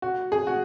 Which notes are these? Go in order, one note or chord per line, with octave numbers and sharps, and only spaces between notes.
F#4
G#4
F#4